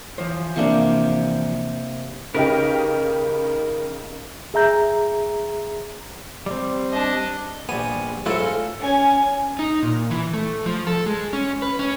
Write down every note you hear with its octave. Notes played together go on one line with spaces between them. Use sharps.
E3 F3 C5
C3 A#3 D4
C#3 D#4 G4 A#4 B4
G#4 E5 A#5 G6
G3 C4
D4 D#5
A#1 G3 B3 G#5
G#2 F#3 A3 B3 E4 F4 A4
C#4 G#5
D#4
A#2
E3
A3
F3
A4
G#3
C#4
B4
C#4